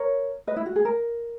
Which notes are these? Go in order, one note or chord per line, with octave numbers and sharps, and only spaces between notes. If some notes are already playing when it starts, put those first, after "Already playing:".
Already playing: A#4 C#5
B4 D#5
E4
F#4
G#4
A#4